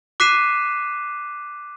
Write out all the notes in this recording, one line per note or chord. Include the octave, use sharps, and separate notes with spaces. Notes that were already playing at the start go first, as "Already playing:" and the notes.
D6 F#6 B6 C7 D#7 E7